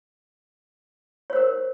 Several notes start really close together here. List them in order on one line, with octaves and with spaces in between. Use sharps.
C#5 C5 A#4